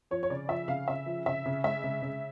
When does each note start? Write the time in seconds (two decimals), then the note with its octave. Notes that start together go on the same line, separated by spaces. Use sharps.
0.11 F3 C#5
0.23 C#5
0.30 C#3 D5
0.49 F3 E5
0.68 C#3 F5
0.88 C#3 E5
1.06 F3
1.26 C#3 E5
1.46 C#3
1.64 G#3 E5
1.84 C#3
2.02 C#3